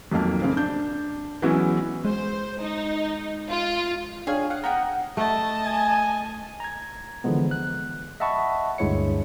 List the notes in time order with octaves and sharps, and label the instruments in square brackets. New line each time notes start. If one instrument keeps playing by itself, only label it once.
[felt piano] B1 F2 D#3 A#3 A5
C#3 A#3 C4
D4 G6
E3 F#3 G#3 B3 C#4 E4
[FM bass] G#3 [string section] C5
[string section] D#4
F4
[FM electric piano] D4 C#5 F5 [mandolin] G#4 G#5
[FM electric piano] F5 [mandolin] F#5
[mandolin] B3 F#5 G5 [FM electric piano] A#5
[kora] A3 [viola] D#5 A5
[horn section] G#5
[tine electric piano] A#5 G#6
D3 E3 F3 G#3 B3
F#6
D#5 E5 F#5 A5 B5 C#6
D2 G2 G#3 E4 C#5 C#7